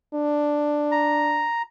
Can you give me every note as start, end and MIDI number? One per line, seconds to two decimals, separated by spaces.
0.14 1.49 62
0.91 1.62 82